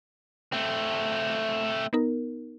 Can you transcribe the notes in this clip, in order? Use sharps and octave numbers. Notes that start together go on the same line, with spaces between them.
A3 C4
B3 D#4 A#4